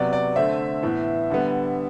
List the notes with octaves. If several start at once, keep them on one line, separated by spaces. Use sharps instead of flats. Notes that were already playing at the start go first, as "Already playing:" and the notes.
Already playing: C3 F#3 B3 D5
D5
D3 A3 C4 E5
A2 E3 B3
D3 G3 B3